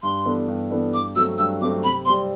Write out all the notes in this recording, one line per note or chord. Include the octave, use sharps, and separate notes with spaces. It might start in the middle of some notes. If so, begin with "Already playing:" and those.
G2 C6
E3 B3 D4 A4
G2
E3 B3 D4 A4
G2 D6
F#3 A3 C4 E6
G2 E6
F#3 A3 C4 D6
C3 B5
G3 C4 C6